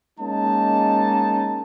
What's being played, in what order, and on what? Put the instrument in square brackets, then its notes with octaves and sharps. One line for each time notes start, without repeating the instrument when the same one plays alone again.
[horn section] G#3 A#3 C#4 D#4 A5